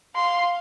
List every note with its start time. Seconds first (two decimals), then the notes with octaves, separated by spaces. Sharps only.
0.15 F5 C6